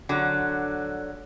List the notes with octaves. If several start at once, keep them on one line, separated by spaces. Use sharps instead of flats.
D3 F#3